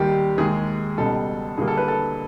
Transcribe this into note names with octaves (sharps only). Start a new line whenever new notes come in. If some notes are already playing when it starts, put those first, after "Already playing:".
Already playing: D#2 D#3 G3 G4
D#2 D#3 G#3 G#4
C#2 B2 G3 A4
G2 D3 G3 A#3 G#4
A4
B4
A4